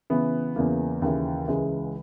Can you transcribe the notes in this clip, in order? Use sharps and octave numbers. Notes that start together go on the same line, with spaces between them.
C#3 E3 B3
E2 C#3 E3 A#3
D#2 C#3 E3
C#2 C#3 E3 G#3